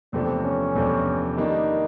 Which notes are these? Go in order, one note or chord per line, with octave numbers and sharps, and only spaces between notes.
E2 C3 F3 A3 C4 D4
C#4
E2 C3 F3 A3 D4
D#3 G3 A#3 D4 D#4